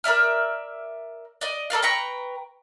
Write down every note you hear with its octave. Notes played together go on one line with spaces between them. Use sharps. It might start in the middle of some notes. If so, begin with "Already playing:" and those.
A#4 D5 E5 F6
D5 D#5
A4 A#4 D5 F5
B4 G5 A#5 C#6